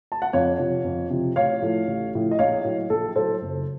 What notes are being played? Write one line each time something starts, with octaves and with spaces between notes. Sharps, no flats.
A5
F#5
F2 C#5 F5
C3 F3
F2
C3 F3
A1 C#5 F5
A2 F3 A3
A1
A2 F3 A3
D#5
A#1 C#5 F5
A2 F#3
A#1 A4
A2 F#3 A4 C5
F#1